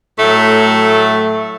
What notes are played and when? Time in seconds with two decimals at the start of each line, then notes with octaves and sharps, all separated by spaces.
0.20 A2 F#3 A3